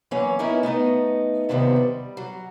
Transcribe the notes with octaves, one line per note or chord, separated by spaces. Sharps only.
E3 F#3 A#3 C#4 C#5
B3 C#4 D#4 E4 A#4 E5
A3 B3 D#4 D#5
D#2 C3 D#3 F3 G3 B3
G3
F#3